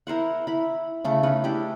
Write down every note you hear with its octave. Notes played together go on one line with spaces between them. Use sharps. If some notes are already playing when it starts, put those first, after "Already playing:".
E4 A#4 C5 F#5
E4 B5
C#3 A3
C#4 D#4 B4
D4 E4 G4